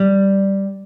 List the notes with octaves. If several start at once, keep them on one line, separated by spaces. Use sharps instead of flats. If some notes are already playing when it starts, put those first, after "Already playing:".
Already playing: G3